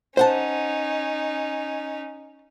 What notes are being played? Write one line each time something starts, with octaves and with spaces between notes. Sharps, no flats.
C#4 D#4 C5 F#5 A5